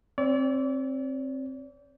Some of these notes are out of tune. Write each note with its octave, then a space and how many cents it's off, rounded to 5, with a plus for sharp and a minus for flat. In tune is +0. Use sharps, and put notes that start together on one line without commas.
C4 +20 D5 -40